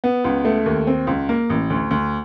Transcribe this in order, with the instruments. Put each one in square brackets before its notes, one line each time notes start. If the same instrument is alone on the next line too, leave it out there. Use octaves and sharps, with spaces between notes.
[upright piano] B3
C#2
A3
D#2
C4
C#2
A#3
A1
D2
D2